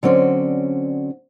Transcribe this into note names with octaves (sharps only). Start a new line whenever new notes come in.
D3 F#3 C4 C#4 D5